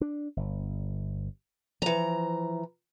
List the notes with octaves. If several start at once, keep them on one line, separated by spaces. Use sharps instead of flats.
D4
G1
E3 F3 A#5